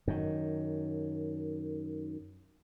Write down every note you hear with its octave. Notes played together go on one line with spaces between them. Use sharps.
F#2 D#3